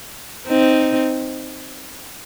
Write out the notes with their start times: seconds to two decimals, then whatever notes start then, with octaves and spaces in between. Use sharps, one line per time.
0.48 C4 D#4